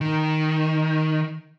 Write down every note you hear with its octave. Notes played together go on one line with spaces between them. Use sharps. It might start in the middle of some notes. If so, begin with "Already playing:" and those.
D#3